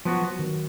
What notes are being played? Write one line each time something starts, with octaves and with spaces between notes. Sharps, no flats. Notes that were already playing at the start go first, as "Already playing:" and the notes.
F3 F#3 B3 F#4
F#3
D#3